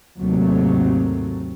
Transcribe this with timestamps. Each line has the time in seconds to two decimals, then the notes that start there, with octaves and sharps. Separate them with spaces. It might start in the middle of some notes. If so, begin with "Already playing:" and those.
0.20 D#2 G#2 C3 F#3 A3